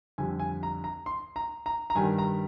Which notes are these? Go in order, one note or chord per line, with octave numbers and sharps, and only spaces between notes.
F2 D3 G3 G#5
G#5
A#5
A#5
C6
A#5
A#5
A#5
G2 D#3 G3 G#5
A#5